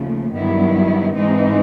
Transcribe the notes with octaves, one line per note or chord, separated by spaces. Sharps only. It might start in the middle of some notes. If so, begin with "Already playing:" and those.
Already playing: D#2 C#3 F3 A3
G2 D#3 F#3 B3 E4
G#2 E3 G#3 C4 D#4